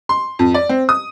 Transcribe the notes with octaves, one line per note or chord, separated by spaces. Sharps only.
C6
F2
D5
C4
D#6